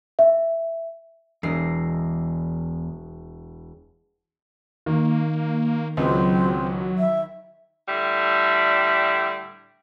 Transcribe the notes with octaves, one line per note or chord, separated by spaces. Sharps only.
E5
E1 E2 A#5 C7
D#3 A#3
C#2 F#3 C4
E5
A2 D3 G3 E5